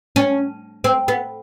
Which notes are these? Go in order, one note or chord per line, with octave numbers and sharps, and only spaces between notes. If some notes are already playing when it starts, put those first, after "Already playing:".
C#4
C4
B3